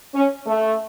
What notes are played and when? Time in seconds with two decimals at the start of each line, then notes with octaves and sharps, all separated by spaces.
0.15 C#4
0.46 A3